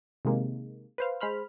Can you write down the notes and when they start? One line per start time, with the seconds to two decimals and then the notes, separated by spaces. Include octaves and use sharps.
0.25 C3 D#3 G#3 A#3
0.98 B4 C5 F5
1.21 G#3 C5 B5 F6